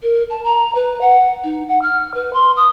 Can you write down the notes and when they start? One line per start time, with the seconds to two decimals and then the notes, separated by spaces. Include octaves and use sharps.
0.02 A#4
0.30 A5
0.44 A#5
0.75 B4
1.01 F#5
1.44 D#4
1.68 F#5
1.82 F6
2.14 B4
2.33 C6
2.56 D#6